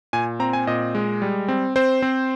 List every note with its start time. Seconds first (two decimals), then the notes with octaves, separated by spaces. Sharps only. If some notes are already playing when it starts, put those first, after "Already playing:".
0.13 A#2 G#5
0.40 C4 A#5
0.53 G#5
0.67 A#2 D#5
0.95 G#3
1.22 G3
1.48 C4
1.76 C4 C5
2.02 C4